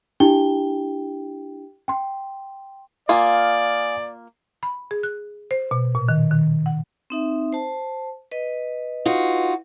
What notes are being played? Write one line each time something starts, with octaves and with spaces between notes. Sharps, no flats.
D4 E4 G4 G5 G7
G5 C6
A#3 F4 D5 F5 G#5 D#6
B5
G#4
F#6
C5
B2
A#2
D#3
D#3
F#5
C4 D#4 E5
C5 A5
B4 D#5
D#4 F4 F#4